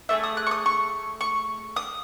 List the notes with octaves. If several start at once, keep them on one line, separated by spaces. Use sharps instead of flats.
A3 D#4 G#4 E5
D#6
F#6
C#6
D#6
C#6
C#6
D#6